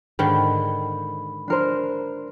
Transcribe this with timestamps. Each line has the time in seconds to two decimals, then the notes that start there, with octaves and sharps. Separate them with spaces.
0.19 G#2 D3 D#3 B5
1.48 D4 A#4 C5